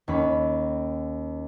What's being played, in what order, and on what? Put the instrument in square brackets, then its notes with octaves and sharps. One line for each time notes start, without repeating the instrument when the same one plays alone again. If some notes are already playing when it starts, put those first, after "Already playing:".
[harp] D#2 C#4 B5